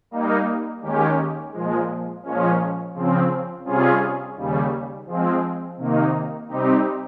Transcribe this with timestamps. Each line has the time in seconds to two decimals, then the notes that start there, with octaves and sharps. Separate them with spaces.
0.11 G3 A#3 D#4
0.82 D#2 D#3 G#3 C#4 G4
1.52 A#2 F3 G#3
2.23 A#2 F3 G#3 C#4
2.94 C#3 F3 C4
3.65 C3 G3 C#4 F4 G#4
4.36 D#2 C#3 G3
5.06 F3 G#3 C4
5.77 C3 D#3 A#3 D#4
6.48 C3 G3 C4 D#4 G4